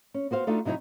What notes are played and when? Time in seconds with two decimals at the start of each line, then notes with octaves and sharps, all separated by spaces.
0.14 C#4
0.31 B3 F#4 C5 F5
0.47 A3 D4 D#4 F4 F#4 A4
0.65 C3 F#3 D#4 E4 C#5